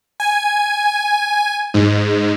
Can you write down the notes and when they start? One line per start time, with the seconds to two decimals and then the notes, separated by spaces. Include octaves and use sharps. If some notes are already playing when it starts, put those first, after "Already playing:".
0.20 G#5
1.74 G#2